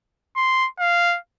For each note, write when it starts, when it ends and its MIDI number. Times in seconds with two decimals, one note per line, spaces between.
0.36 0.67 84
0.79 1.17 77